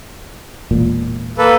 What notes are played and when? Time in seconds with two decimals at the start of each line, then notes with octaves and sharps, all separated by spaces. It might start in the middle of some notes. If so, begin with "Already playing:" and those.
0.71 E1 A#2
1.38 A#3 A4 B4